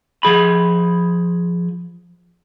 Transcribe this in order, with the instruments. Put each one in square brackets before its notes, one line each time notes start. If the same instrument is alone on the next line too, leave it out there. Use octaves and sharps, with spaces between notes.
[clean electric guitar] F3 G#4 B5